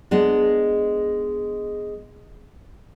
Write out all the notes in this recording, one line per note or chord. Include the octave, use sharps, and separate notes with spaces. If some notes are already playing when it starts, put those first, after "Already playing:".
G#3 B3 D4